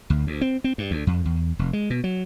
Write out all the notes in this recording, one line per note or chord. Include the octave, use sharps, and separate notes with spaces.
D2
D2
C4
C4
G2
D2
F2
E2
F1
G#3
B2
F#3